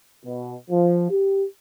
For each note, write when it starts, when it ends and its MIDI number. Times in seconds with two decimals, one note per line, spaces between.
0.24 0.54 47
0.70 1.07 53
1.09 1.45 67